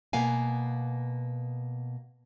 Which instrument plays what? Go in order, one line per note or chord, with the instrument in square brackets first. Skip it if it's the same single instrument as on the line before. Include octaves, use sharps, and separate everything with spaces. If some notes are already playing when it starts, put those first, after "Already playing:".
[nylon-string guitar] B2 A#3 B3 F5 G#5